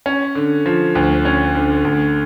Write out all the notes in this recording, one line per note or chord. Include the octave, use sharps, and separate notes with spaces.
C#4
D3
F3
D2
C#4
D3
D2